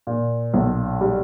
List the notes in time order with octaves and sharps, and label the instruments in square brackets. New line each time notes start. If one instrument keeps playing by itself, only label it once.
[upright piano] A#2
B1
G3